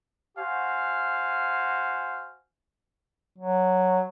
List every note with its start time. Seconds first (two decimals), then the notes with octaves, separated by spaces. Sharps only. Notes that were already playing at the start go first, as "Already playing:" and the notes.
0.38 F#4 C5 F5 G#5
3.39 F#3